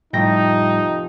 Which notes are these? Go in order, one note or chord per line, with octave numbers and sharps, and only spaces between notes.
F1 A2 G3 D#4 G5 A#6